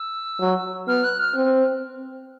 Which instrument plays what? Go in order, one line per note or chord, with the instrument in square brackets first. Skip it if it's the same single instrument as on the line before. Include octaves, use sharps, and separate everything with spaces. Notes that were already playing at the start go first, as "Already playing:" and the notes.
Already playing: [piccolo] E6
[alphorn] F#3
[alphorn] B3 [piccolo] F6
[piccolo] F#6
F6
[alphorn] C4